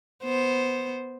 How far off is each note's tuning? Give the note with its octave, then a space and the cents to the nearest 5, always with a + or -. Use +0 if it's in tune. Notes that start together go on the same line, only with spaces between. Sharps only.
B3 +0 C5 +0